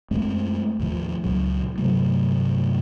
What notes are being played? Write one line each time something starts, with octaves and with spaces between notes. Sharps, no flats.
F#2 G#3 A3 C4
D#2 A2 F3
C#2 A#2 F#3
G2 C3 F#3 A3